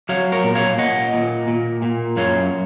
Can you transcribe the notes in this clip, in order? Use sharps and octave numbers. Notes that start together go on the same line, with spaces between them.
F#3 C#5 F5
A#4 C#5
A#2
C#5 F5
A#2 D#5 F#5
A#2
A#2
A#2
F#2 C#5 F5